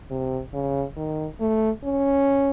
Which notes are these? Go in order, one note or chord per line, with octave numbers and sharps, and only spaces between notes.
C3
C#3
D#3
A3
C#4